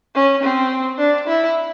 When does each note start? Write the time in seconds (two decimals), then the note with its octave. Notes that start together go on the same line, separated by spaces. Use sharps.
0.15 C#4
0.43 C4
0.99 D4
1.27 E4